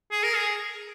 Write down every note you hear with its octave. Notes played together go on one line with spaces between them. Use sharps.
G#4
A#4
G#4